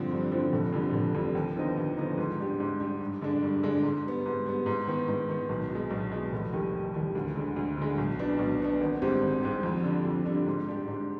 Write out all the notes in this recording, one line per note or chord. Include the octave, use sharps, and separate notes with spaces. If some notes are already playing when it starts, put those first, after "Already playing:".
Already playing: G2 D3 F3 C4
G2
D3 F3 C4
F1
F2 D3 G3
F1
F2 D3 G3
D#2
D3 F3 B3 D#4
D#2
D3 F3 B3 D#4
G#2
G3 D4 G4
G#2
G3 D4 G4
G2
D3 G#3 D4
G2
D3 G#3 D4
G#2
G3 B3
G#2
G3 B3
G#2
D#3 B3
G#2
D#3 B3
B1
B2 G#3
B1
B2 G#3
F1
D#2 D#3 G3
F1
D#2 D#3 G3
D2
D3 G#3
D2
D3 G#3
B1
B2 B3 D4
B1
B2 B3 D4
G#1
G#2 G3 C4 G4
G#1
G#2 G3 C4 G4
F2
D3 G3 D4
F2
D3 G3 D4
G#2
G3 D4 G4
G#2